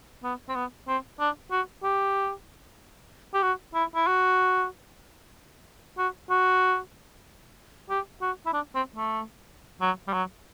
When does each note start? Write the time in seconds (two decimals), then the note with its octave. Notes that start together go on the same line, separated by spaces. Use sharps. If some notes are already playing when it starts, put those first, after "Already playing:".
0.24 B3
0.49 C4
0.55 B3
0.88 C4
1.19 D4
1.51 F#4
1.83 G4
3.34 G4
3.43 F#4
3.74 E4
3.95 E4
4.07 F#4
5.98 F#4
6.30 F#4
7.90 G4
8.21 F#4
8.46 E4
8.53 D4
8.75 C4
8.96 A3
9.81 F#3
10.07 G3
10.13 F#3